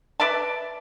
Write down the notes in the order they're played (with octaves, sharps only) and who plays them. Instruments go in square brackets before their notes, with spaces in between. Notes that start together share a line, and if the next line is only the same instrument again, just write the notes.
[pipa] B4 D5 E5 A5